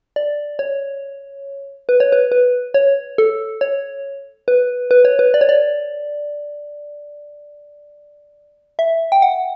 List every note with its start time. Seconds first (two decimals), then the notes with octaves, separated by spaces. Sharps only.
0.16 D5
0.59 C#5
1.89 B4
2.00 C#5
2.12 B4
2.32 B4
2.74 C#5
3.18 A4
3.61 C#5
4.48 B4
4.91 B4
5.05 C#5
5.19 B4
5.34 D5
5.41 C#5
5.49 D5
8.79 E5
9.12 G5
9.22 F#5